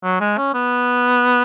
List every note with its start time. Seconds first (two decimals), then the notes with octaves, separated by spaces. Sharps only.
0.03 F#3
0.20 G#3
0.37 C#4
0.54 B3